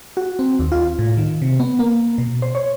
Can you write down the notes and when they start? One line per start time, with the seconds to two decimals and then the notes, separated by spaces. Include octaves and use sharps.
0.17 F#4
0.39 C4
0.59 D#2
0.72 F4
0.99 A2
1.17 D#3
1.42 C3
1.60 B3
1.79 A#3
2.18 B2
2.42 C5
2.55 C#5